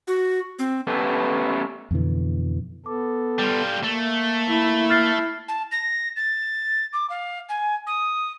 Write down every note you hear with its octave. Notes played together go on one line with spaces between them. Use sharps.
F#4
C4
A3 B3 C#4 G4 A4 B4
F2 B2 D3 E3
B3 A4 D6
G3 F4
A3 A#3
E4
F6 A6 C7
A5
A#6
A6
D6
F5
G#5
D#6